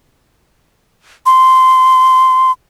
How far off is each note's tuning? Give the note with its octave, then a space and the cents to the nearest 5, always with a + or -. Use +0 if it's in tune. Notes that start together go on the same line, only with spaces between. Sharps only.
C6 -15